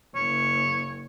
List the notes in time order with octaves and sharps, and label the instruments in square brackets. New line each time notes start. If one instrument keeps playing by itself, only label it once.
[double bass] F#1 [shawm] C#5